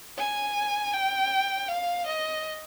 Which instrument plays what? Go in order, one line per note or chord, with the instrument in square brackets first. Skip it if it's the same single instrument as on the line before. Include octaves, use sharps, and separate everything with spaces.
[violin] G#5
G5
F5
D#5